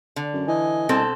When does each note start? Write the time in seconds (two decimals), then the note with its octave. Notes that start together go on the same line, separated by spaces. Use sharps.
0.16 D3
0.34 F#2
0.48 E3 D#5 G#5
0.89 C2 B2 C4 A4